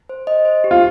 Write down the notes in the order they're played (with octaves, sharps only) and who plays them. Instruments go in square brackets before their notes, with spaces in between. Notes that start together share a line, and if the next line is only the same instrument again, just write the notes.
[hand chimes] C5
D#5
C5
G4
[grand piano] F4